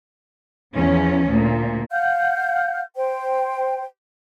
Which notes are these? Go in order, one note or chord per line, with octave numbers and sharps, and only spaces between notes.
E2 F3 C#4
D2 A#2
F5 F#5 F6 G6
C5 G5